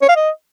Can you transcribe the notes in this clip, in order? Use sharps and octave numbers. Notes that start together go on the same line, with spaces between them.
C#5
F5
D#5